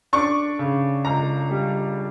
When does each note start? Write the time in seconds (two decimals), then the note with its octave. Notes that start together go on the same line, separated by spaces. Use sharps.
0.13 D4 C#6
0.59 C#3
1.05 C#2 A#5
1.51 G3